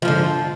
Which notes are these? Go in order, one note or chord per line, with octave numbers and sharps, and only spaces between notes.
G#2 D3 F3